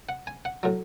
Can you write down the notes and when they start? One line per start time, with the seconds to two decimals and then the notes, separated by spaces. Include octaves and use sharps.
0.09 F#5
0.27 G#5
0.45 F#5
0.63 A2 F#3